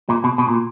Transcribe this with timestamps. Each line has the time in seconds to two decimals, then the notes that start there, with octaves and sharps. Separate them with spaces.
0.09 A#2
0.24 B2
0.38 B2
0.48 A#2